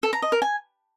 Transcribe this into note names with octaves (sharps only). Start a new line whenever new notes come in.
A4
A#5
D#5
A#4
G#5